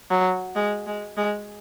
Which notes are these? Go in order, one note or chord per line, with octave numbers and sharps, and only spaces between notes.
F#3
G#3
G#3
G#3